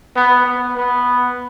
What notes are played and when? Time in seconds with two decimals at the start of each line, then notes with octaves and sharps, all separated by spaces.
0.16 B3
0.46 B3
0.77 B3